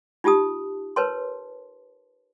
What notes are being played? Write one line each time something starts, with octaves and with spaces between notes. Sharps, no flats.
D#4 F4 G4 A5 D#6
A#4 B4 C#5 A5 C6